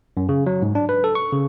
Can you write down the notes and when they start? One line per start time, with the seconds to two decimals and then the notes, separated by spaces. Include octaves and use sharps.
0.17 F#2
0.29 C#3
0.46 F#3
0.62 G#2
0.75 D4
0.89 B4
1.04 A4
1.15 C#6
1.32 C#3